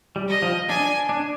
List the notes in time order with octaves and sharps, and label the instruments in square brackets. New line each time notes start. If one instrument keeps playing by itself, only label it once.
[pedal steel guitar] G3
[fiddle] D#5
[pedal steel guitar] F3
[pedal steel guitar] D4 [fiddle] G#5
[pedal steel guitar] D4